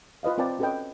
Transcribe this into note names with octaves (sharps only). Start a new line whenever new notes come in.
F4 B4 D#5 F5
C4 F4 A#4 D5 G5 A5
C#4 F#4 A4 B4 D#5 G5